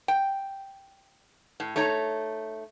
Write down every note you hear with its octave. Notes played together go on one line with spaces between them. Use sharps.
G5
A2
A3 D#4 C#5 A#5